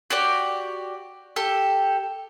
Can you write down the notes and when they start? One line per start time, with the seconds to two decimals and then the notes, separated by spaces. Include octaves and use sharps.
0.10 F#4 G4 D5
1.36 G4 A4